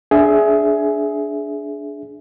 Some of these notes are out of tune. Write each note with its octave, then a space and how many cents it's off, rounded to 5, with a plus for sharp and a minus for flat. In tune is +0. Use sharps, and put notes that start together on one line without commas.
D4 -10 G#4 +15 E5 +0